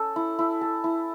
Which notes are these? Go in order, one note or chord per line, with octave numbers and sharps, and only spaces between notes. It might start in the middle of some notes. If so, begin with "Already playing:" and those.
Already playing: C#4 A4
E4
E4
A4
E4